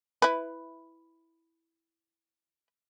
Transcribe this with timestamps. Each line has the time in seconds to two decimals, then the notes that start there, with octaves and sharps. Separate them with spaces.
0.22 E4 B4